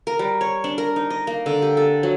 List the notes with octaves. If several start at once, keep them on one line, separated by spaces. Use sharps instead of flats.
A#4
G3
C#5
D4
A#4
D#4
D#5
A#3
D3
G4
A4
F#3